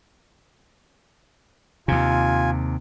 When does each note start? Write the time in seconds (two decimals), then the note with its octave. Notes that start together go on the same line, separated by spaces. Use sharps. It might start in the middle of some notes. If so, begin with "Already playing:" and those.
1.88 D#2 C3 F4 G#5